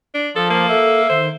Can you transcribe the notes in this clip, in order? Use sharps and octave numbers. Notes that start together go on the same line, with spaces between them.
D4
F3 A4
A#3 C5
A4 E5
D#3 C5